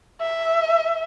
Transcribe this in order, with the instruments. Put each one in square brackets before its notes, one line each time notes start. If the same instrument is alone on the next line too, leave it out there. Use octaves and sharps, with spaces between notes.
[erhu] E5